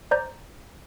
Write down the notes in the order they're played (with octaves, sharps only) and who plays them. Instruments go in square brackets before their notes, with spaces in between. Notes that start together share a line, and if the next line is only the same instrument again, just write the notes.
[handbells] C5 D5 A#5 G6